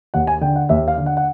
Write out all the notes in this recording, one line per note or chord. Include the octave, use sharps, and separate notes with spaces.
D#2 F#5
G#5
D3 G5
F#5
D#2 E5
F5
D3
F#5
F#5